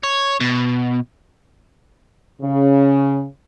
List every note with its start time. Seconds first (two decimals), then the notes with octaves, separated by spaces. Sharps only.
0.03 C#5
0.40 B2
2.42 C#3